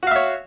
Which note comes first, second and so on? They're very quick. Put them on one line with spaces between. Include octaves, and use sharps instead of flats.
F#4 F5 E5 C#5